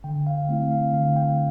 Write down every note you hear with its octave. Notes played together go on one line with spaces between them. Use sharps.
D3 G5
F5
A3 C4 E4 F5
F5
D3 F5
G5